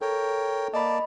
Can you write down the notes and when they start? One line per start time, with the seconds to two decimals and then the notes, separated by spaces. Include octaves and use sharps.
0.01 A4 A#4 C#5 G5
0.74 A#3 D5 D#5 A5 B5